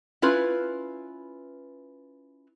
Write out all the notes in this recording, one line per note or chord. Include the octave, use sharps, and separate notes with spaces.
C#4 E4 F4 B4